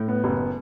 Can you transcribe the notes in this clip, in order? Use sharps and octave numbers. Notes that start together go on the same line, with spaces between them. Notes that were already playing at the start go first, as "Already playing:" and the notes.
Already playing: A2
B3
F#1